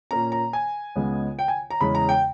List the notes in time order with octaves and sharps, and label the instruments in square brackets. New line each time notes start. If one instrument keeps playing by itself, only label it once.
[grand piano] A#2 A#3 C#4 A#5
A#5
G#5
C#2 C#3 G#3 B3
G5
G#5
A#5
E2 C#3 E3 G#3 C#4 B5
A#5
G5